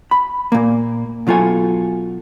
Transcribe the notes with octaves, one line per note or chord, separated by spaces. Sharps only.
B5
A#2 A#3
B2 F#3 F4 A4 G#5